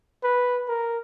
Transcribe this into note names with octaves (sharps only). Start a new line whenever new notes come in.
B4
A#4